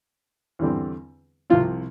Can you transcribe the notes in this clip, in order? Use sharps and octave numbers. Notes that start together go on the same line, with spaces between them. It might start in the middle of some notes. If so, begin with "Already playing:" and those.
E2 D3 G3 C4
C2 C3 F3 C4 F4